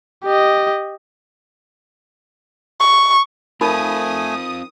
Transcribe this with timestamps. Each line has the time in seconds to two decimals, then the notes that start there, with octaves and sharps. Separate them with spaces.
0.24 G4 D#5
2.80 C#6
3.61 A3 C4 D#4 F4 A#4 G#5 B5 D#6